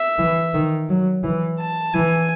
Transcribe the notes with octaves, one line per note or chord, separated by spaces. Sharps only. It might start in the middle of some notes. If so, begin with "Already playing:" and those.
Already playing: E5
E3
D#3
F#3
E3
A5
E3 G#5